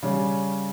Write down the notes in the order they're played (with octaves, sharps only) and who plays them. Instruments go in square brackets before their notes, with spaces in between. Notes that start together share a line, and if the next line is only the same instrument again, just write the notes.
[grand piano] C#3 G3 C#4